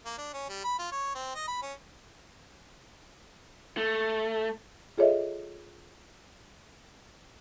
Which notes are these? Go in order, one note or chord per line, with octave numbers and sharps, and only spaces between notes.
A#3
D4
C#4
G3
B5
F4
C#5
C4
D#5
B5
C#4
A3
F4 G#4 A4 C#5 D#5 E5